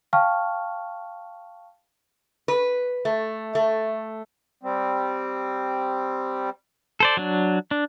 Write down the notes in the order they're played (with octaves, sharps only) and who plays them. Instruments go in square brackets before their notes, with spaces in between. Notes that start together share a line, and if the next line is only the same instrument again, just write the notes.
[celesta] F5 G5 A5 C#6 F6
[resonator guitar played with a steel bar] B4
A3
A3
[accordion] G3 C4
[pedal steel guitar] A4 C5 D5
F#3 D4
D4